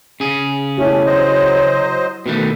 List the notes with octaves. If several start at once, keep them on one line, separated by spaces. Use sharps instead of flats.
C#3 G#4
B2 A3 C#4 E4 G4 C#5
F#3 C5 D#5
B2 D#3 A3 B4